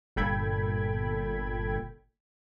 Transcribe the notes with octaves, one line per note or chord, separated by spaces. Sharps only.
G1 A#2 A4 G5 B5 G#6